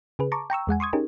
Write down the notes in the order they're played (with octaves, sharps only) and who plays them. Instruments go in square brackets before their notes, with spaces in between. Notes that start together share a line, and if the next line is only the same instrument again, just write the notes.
[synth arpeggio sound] C#3 G#4 B4
A5 A#5 C#6 D6
G5 A#5 C#6 E6
E2 G#3 F#5 G#5
C6 C#6 D#6 G#6
C#4 D#4 G4 G#4 A#4